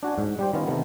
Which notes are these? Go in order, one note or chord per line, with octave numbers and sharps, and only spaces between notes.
D4 F#4 F#5 G#5
G#2
G3 G4 C5
D#3 B3 C#4 F4
C3 D#3 A3 B3